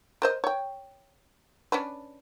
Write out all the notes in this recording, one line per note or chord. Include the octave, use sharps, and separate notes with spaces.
A#4 C5 D#5
C#5 G5
C#4 D4 B4